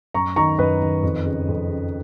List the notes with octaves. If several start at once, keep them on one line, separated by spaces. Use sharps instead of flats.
F#2 A#5 C#6
D#3 A#5 C#6
F#2 B4 D#5
D#3
F2
C#3
F2
C#3